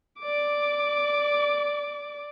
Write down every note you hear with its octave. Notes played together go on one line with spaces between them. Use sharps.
D5 D6